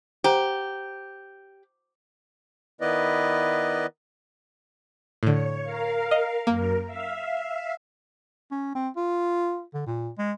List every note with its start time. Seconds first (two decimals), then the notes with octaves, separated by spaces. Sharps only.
0.24 G4 C5 F#5 A#5
2.81 D#3 B3 E4 B4 D5 D#5
5.23 A2 D3 C#5
5.63 A#4 F5
6.11 D#5
6.47 F#2 A#3 A#4
6.86 E5 F5
8.52 C#4
8.75 C4
8.97 F4
9.74 D3
9.86 A#2
10.18 G#3